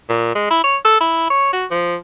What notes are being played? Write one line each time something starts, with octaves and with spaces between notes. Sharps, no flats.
A#2
G#3
E4
C#5
A4
E4
C#5
F#4
F3